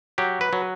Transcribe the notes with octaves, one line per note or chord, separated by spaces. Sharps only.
F#3 G4
B4
F#3